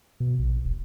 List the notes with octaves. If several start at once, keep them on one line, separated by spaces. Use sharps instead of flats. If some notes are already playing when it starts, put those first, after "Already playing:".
B2
A#1
E1